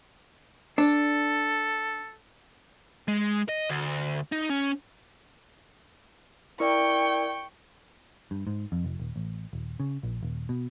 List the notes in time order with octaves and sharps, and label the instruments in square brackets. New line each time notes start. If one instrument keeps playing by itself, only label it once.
[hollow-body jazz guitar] D4 [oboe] A4
[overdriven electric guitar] G#3
D#5
D2
D#4
C#4
[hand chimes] E4 A#4 D5 [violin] G5 C#6
[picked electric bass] G2
G#2
F2
F1
D#1
A1
D#1
C#3
A#1
D#1
B2